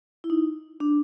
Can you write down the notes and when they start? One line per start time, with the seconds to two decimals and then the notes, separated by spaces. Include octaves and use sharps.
0.24 E4
0.30 D#4
0.80 D4